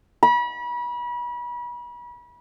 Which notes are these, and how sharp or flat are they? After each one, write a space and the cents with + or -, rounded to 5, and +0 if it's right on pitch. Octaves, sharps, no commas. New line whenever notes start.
B5 -35